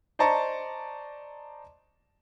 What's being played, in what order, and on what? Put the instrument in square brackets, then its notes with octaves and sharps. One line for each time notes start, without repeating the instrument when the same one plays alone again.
[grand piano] C5 D5 D#5 A5 A#5 C#6